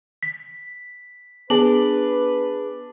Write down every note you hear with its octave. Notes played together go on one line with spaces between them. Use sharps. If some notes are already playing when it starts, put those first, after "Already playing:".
B6
B3 D4 G#4 B4 F#7